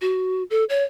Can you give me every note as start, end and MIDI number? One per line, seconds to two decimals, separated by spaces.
0.01 0.43 66
0.50 0.64 69
0.69 0.84 73